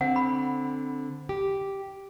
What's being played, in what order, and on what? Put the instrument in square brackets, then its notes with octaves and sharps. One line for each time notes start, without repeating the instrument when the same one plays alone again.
[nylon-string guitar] D3 C4 [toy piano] F#5
[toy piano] B5
[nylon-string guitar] G4